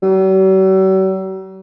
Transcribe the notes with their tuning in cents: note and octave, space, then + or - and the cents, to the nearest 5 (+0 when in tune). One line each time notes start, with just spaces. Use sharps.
F#3 +45